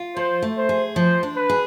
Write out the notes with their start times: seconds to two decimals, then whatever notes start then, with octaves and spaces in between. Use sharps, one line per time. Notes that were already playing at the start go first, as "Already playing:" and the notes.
Already playing: F4
0.16 F3 C5
0.42 A3
0.56 C5
0.69 G#4
0.96 F3 C5
1.23 D4
1.36 B4
1.50 G#4